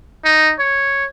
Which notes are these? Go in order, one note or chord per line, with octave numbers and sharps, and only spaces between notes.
D#4
C#5